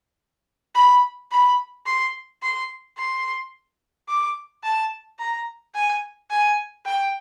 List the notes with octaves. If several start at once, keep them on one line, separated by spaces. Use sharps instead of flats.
B5
B5
C6
C6
C6
D6
A5
A#5
G#5
G#5
G5